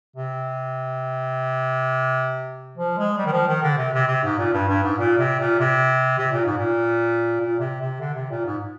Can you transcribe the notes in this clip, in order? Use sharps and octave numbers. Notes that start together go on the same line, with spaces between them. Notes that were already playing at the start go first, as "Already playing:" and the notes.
C3
F3
G#3
G3
D#3
F3
D#3
D3
C3
C3
C3
G#2
A#2
G2
G2
G#2
A#2
C3
A#2
C3
C3
A#2
G#2
A#2
A#2
C3
C3
D3
C3
A#2
G#2